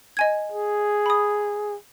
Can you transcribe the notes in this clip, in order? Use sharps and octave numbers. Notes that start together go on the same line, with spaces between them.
D#5 G#5 G#6
G#4
B5 D#6